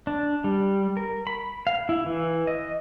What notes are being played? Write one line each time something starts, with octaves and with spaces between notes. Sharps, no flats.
D4
G3
A#4
B5
F5
E4
E3
D#5